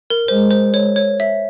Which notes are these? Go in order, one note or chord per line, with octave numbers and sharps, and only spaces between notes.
A#4
G#3 C5
C5
C#5
C#5
E5